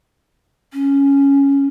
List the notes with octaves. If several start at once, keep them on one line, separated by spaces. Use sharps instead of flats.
C#4